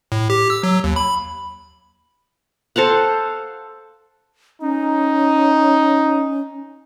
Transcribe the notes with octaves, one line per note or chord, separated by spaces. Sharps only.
A2
G4
E6
F#3
D#2
B5
A4 C5 F5 F#5
C#4 D#4